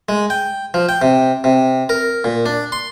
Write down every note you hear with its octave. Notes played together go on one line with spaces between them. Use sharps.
G#3
G5
F3
G5
C3
C3
A#4
A#2
D4
C6